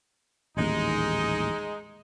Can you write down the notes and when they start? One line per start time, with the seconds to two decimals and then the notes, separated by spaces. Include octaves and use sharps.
0.57 D#1 A1 D#2 G#3 D#4